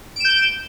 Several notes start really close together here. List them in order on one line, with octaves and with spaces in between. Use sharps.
D7 E7 G6